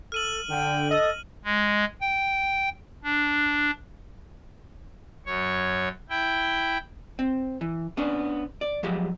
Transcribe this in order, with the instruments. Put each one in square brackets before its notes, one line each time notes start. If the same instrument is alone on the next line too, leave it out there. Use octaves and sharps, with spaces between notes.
[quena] A4 [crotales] F6 D#7 F#7
[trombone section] D3 [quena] G5
[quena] A4 [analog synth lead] D#5
[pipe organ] G#3
G5
D4
F#2 C#5
E4 G5
[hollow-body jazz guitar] C4
E3
B3 C#4 D4
D5
F3 F#3 G#3 G4